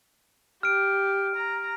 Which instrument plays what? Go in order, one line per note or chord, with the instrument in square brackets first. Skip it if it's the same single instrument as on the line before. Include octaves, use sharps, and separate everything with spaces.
[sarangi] G4 [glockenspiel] F6 D7
[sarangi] A#5